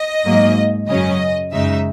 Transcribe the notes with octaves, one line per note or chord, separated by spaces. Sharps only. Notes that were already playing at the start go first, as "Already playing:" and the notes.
Already playing: D#5
G#2 F#3 A#3
F#2 C#3 F#3 C#4 D#5
F#2 C#3 G#3 D#4 E5